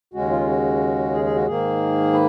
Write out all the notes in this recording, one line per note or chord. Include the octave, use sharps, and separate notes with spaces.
D#2 C#3 G#3 C#4 F#4
F4
F#4
G#4
G#4
F#4
G#2 D#3 A#3 G#4
B4